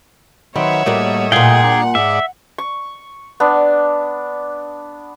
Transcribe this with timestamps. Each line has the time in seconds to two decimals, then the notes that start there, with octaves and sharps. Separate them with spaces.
0.56 D#3 F#3 C4 B4 C#5 E5 F#5
0.86 A2 G3 A#3 F#4 D#5
1.32 A#2 F4 G#4 F#5 G5
1.63 A#3 D4
1.95 G#2 D5 E5
2.58 C#6
3.40 B3 D4